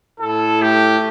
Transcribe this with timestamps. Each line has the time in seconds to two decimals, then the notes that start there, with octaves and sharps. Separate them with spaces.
0.20 A2 A4
0.61 A3 G4